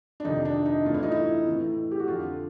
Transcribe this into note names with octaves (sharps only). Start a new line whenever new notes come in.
D4
F2 C3 D#3 D#4
D4
D#4
A2 E3 F4
E4
D#4
E4
A2 E3
G4
F#4
F2 D3 F4